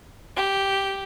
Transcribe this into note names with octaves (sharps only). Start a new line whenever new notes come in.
G4